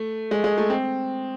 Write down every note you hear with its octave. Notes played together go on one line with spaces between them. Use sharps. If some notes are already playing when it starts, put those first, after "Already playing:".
Already playing: A3
G#3
G#3
A3
C4